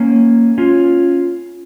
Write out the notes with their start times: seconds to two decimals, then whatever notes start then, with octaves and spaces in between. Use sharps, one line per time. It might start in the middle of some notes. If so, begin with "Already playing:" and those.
Already playing: A#3 C#4
0.58 C#4 F4